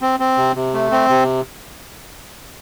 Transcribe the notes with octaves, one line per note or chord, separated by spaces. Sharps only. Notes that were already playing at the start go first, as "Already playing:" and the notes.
C4
C4
C3
C3
A3
C4
C3